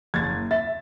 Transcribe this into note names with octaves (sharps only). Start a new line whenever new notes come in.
F#1 G#6 A6
E5 A6